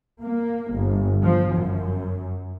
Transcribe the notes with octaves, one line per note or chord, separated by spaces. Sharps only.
A#3
G1
F3
F#2